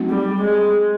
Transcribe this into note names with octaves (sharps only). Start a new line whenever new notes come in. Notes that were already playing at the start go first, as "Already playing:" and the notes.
Already playing: F#3 A3 C4 D#4 F#4
G3
G#3